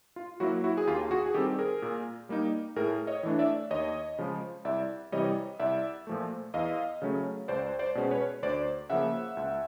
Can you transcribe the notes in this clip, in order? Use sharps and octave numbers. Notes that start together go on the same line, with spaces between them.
F4
F#3 A#3 E4 F#4
E4 F#4
G#4
D#2 F4 G4
F#4 G#4
G#4
D#3 G3 C4 G4 A4
G#4 A#4
A#2
G3 A#3 D#4
A2 G#4 A#4
C#5 D#5
E3 A3 D4
D5 E5
D#2 C#5 D#5
C#3 F3 G#3
C2 D5 E5
C3 E3 G3 C#5 D#5
C2 D5 E5
A#2 F3 A3
E2 D#5 F5
C#3 F#3 A3 C#4
C#2 C5 D5
C5 D5
B2 G#3 C#4
B4 C#5
D2 C5 D5
C#3 F3 A#3 E5 F#5
C#2